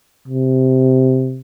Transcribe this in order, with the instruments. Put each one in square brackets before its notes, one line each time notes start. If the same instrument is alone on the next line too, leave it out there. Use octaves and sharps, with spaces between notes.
[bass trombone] C3